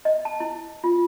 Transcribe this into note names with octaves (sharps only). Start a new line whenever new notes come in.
D#5
A5
E4
F4